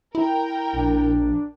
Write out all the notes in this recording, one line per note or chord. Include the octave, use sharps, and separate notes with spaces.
E4 A#4 G5
A#1 D4